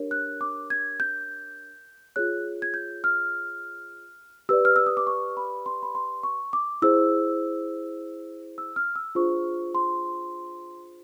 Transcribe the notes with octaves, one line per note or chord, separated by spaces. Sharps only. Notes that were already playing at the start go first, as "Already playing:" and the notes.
Already playing: D4 G4 A#4 C#5
F#6
D6
G#6
G6
F4 G#4 C#5 F#6
G#6
G6
F6
G4 B4 D5 E6
F6
E6
D#6
D6
C#6
B5
C6
B5
C6
C#6
D6
E4 G#4 C5 E6
E6
F6
E6
D4 F4 G#4 C5 C#6
C6